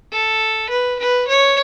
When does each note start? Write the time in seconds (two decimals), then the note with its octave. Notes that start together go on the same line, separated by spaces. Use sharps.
0.12 A4
0.70 B4
0.99 B4
1.28 C#5